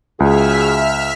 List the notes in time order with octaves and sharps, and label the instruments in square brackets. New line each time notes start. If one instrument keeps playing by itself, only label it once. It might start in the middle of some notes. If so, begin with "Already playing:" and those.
[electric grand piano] C#2 [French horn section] C#3 F#4 G#4 [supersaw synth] E5 F6 B6